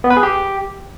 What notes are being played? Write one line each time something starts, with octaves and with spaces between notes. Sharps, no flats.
B3
B4
G#4
G4